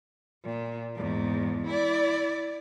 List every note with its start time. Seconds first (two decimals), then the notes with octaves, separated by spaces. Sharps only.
0.44 A#2
0.95 E2 G#2
1.67 E4 D5